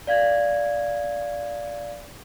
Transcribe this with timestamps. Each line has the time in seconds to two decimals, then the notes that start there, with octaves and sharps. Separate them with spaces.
0.07 D5 F5 G#6